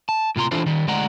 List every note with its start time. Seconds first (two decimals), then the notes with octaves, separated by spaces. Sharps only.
0.09 A5
0.36 A2 C3 F4 A#5 C6
0.51 E3 D4 E4 F4 A4 C5
0.66 D#3 G3
0.88 D2 G#3 D5 D#5 F#5 A#5